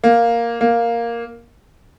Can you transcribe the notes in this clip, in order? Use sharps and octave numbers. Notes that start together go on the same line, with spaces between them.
A#3
A#3